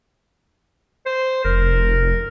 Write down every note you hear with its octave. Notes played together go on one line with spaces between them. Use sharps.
C5
F1 A#4